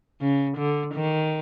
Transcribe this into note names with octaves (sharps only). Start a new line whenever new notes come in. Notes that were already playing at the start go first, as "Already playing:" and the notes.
C#3
D3
D#3